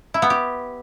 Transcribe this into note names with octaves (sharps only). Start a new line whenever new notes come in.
E4
B3
G4